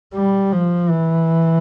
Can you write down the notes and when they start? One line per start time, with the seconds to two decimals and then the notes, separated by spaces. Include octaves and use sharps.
0.14 G3
0.52 F3
0.89 E3